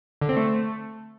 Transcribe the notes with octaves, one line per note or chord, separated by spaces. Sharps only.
D3
C4
A3